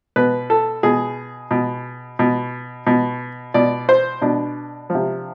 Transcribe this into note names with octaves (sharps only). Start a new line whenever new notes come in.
B2 B4
A4
B2 G#4
B2
B2
B2
B2 D5
C5
B2 D4
F3
C3